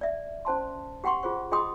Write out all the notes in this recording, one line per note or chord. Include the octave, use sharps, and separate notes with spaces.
D5 E5
C#4 C5 A5 C6
G4 F#5 G5 C6 C#6
F4 G#4 C5 C#6
F4 G#4 D#5 G5 C6 D#6